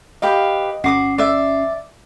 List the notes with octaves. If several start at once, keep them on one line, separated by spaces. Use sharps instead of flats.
G4 B4 D#5 F5
G1 C#4 F#4 D6 D#6 C7
D5 E5